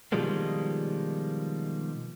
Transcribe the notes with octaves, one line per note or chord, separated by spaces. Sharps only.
B2 D#3 F3 G3 G#3 A#3